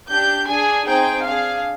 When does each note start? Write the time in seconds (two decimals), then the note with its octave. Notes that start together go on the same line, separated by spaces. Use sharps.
0.10 D4 G4 G6
0.48 D4 G#4 G#5
0.86 C4 D#4 G#4 G5
1.25 D4 G#4 F5